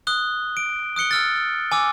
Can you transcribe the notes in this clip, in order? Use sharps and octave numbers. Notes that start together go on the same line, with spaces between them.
D#6 F#6 G7
D7
D#6 F#6 C#7 G7
E6 F6 A6
F6
G#5 D6 E6